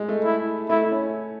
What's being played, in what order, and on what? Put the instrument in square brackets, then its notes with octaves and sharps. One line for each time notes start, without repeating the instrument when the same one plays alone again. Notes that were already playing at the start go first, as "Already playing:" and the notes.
Already playing: [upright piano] G#3
A3
[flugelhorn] E4
[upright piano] A3 [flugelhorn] E4
[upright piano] C#4